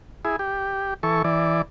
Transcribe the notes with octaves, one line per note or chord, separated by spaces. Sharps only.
E4 G#4
G4
E3 A4 C#6
E3 D5